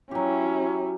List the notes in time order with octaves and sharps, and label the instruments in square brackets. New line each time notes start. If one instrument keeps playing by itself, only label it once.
[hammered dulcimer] F#3 G4 [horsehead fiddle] C#4 E4